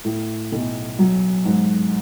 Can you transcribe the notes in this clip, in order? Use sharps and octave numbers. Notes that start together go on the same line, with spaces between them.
A2
B1
F#3
G#2